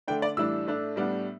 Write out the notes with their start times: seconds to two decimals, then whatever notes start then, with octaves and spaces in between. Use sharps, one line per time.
0.08 D3 A3 D4 G5
0.22 D5
0.37 A2 E3 G3 D4 E6
0.67 A2 A3 D4
0.96 A2 G3 B3 D4